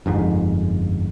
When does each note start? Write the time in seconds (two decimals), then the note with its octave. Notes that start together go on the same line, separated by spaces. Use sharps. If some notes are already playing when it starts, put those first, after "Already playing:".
0.06 G1 F2 G#2